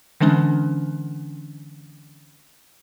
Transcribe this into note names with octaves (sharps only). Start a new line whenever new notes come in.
D3 E3 G#3 C#4 D4